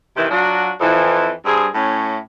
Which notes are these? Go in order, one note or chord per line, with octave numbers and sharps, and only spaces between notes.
C3 D#3 E3
F#3 D4 F4 F#4
F2 E3
G2 C4 G#4
A2 C#4